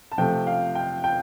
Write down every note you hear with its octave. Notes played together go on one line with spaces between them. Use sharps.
A5
C3 F3 A3 G5
F5
G5
G5